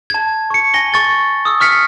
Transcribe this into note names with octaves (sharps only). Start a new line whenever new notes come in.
A5 G#6
C#6 C#7
G#5 A#6 G7
C#6 A6 G7
D#6 E6
C#6 F6 B6 C#7